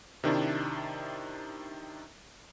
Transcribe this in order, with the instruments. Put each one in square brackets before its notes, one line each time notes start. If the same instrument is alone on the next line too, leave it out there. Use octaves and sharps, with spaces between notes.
[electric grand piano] C3 D#3 D4 E4